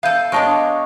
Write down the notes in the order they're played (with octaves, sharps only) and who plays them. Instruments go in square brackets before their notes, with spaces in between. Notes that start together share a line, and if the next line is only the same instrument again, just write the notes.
[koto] B3 A4 [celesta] E5 G6 D#7 [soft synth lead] F5
[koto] G#3 B3 D4 [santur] C#5 D#5 [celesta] A5 A#6 D7